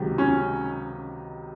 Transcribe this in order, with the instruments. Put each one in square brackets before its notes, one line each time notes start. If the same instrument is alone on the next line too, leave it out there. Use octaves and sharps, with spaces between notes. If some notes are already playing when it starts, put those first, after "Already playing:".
Already playing: [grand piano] C#2 C3 D#3 F#3
[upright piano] C#4